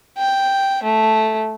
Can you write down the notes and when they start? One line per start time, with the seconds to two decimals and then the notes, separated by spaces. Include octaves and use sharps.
0.18 G5
0.83 A3